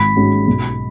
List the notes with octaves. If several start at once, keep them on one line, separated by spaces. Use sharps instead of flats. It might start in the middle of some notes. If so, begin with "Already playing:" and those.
Already playing: G#1 B5 B6
G#2 G#3 C#4 F#4
B1